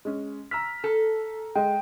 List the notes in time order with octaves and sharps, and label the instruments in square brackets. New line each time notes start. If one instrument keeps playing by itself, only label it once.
[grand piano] G#3 C#4
[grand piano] A#5 E6 F6 [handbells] B6
[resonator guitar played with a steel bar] A4
[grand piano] G#3 [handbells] G5